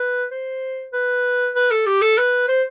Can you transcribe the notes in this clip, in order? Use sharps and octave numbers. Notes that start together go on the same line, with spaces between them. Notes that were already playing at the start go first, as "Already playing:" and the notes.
Already playing: B4
C5
B4
B4
A4
G4
A4
B4
C5